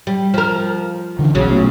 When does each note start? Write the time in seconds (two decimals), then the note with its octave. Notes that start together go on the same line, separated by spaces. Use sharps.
0.07 G3
0.34 F3 A#4
1.19 D3 E3
1.35 A#1 C#3 F#3 C#4
1.49 B2 A3 B3